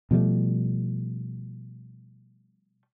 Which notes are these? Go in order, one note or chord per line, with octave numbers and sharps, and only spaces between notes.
B2 F3 G3 A3